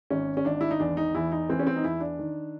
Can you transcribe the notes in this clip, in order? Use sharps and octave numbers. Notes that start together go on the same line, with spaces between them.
G#1 C#4
C#4
G#1 D4
E4
D#4
E2 D4
D#4
E2 E4
D#4
E3 C4
C#4
C4
D#4
E2 E4
D4
D#3